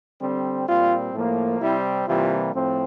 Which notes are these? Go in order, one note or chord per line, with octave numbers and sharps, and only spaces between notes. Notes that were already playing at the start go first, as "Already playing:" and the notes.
D3 G3 C4
A#2 G3 C4 F4
A2 F3 A#3
C3 G3 C4 E4
C3 E3 G3 A#3 F4
A2 F3 C4